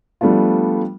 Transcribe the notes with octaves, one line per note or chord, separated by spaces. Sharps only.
F3 G3 A3 B3 D4 F4